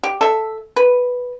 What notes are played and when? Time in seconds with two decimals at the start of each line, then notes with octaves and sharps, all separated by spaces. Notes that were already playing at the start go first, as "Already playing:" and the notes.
0.03 G4
0.21 A4 E5
0.76 B4